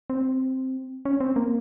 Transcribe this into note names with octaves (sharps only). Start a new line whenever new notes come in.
C4
C#4
C4
A#3